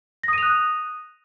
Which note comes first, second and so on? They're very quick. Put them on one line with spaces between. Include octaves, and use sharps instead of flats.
A#6 D#6 D#7 F7 F#6